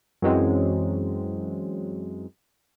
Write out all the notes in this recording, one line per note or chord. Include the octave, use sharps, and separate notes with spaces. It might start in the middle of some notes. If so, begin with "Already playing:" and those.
F#2 E3 F#3 G#3 C4